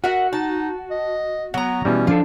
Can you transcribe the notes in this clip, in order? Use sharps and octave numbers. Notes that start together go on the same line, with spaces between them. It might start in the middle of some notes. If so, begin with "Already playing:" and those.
F#4 A#4 E5 F#5
D#4 A5
D#5
F#3 B3 F#5 A#5
B2 E3 G3 C#4
F3 D4 F4 A4